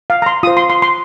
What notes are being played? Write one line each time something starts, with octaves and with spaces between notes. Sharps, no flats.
F5
A#5
C6
F4 C5 D#6
C6
C6
C6